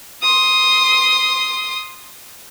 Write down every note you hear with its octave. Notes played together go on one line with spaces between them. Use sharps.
C6 D#6